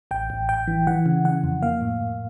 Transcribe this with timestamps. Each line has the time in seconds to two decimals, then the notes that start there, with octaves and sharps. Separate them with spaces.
0.11 A1 G5
0.30 A1
0.49 A1 G5
0.67 E3
0.87 E3 F#5
1.06 C#3
1.25 C#3 F#5
1.44 F2
1.63 A#3 F5
1.81 A2
2.01 A2